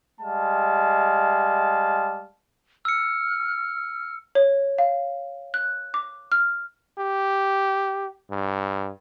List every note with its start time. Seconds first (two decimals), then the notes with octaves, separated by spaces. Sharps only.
0.20 G3 G#3 F5 A5
2.85 E6 F6 C#7
4.35 C#5
4.78 F5
5.54 F#6
5.94 D6
6.32 F6
6.98 G4
8.31 G2